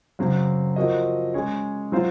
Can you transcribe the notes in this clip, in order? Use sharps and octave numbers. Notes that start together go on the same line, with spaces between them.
F#2 C#3 F#3 C4
F3 C4 F#4 A#4 D#5
G#3 C#4 G#4 C#5
F#3 C4 F4 C5